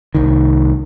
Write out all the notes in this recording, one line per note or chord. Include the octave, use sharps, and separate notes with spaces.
C2 D#3